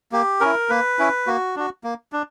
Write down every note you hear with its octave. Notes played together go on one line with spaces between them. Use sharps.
A#3 G4
C#4 E4 A#4
A#3 B4
C#4 E4
A#3 F#4
D4 F#4
A#3
D4